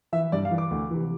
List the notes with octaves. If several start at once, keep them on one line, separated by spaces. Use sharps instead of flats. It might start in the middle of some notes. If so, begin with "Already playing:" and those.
E3 E5
G2 D5
F5
E3
D6
D2
C3 E3